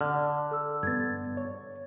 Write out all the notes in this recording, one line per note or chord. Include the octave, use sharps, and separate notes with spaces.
D3 F6
A4 E6
G2 B3 G#6 A6
C#5